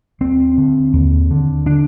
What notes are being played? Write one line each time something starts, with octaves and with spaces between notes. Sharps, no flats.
D#2 C4
D3
D#2
D3
D4